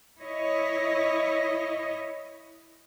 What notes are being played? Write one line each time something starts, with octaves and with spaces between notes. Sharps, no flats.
E4 C#5 D#5